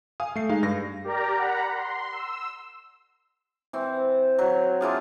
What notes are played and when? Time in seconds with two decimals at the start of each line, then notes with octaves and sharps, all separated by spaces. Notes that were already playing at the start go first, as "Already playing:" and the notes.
0.20 F5 G#5 D#6
0.36 A3 C7
0.49 G#3 D#4 F5
0.63 G2 A#6
1.04 G4 A#4 D5 A#5
1.37 F#5 A#5 B5
1.74 C6
2.12 E6
3.73 E3 C4
4.39 F#3
4.81 D4 E4 F4 G#4